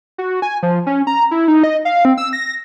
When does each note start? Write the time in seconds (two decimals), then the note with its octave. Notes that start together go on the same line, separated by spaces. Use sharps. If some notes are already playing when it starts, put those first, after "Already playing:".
0.18 F#4
0.42 G#5
0.63 F3
0.87 C#4
1.07 A#5
1.31 E4
1.48 D#4
1.63 D#5
1.85 F5
2.05 C4
2.18 E6
2.33 A#6